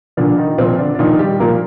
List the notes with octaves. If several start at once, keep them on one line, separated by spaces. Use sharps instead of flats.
A#2 D3 F3 D4
D#3 D#4
A#2 F3 C4
D3 D4
D4
A#2 D#3 F3 D#4
G3 G4
A#2 F3 A#3 A#4